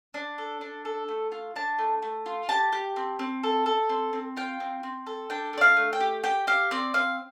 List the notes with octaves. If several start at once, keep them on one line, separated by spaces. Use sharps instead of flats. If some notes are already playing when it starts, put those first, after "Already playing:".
D4
A4
D4
A4
A3
F4
D4 A5
A3
A3
F4
G4 A5
G4
C4
C4
A4
A4
C4
C4
F4 G5
C4
C4
A4
D4 G5
A3 D5
F5
A3
G5
G4
G4 G5
G4 F5
C4 D5
C4 F5